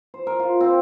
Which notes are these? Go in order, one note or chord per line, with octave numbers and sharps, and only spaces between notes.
C5
A#4
F4
C4